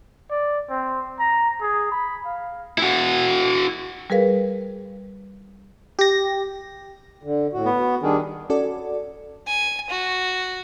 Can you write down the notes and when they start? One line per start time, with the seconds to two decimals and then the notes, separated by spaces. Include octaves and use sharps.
0.30 D5
0.70 C4
1.19 A#5
1.61 G#4
1.91 B5
2.25 F5
2.78 E4 F#4
4.10 G3 G#4 A#4 B4 F5
5.99 G4 A#6
7.23 D3
7.53 A2 F#4
7.65 B3
7.79 F#4
8.02 D#3 G3 D4 G#4
8.50 C#4 F#4 A4 D5
9.47 G#5
9.90 F#4